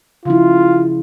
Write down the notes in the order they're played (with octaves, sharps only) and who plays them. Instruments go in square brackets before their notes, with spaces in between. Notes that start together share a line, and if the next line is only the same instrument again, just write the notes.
[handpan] C#3 F3 E4 [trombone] F4